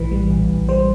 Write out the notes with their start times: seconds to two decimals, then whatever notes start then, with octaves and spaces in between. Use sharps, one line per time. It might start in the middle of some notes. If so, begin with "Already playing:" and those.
Already playing: A#1 A2 E3 B4
0.11 G3
0.30 A#1
0.50 A#1
0.69 G3 C5